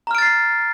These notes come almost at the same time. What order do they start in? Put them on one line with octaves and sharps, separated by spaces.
A#5 F6 D7 A6 C7